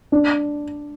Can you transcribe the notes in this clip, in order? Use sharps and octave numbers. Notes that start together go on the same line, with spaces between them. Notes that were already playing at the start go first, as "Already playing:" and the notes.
D4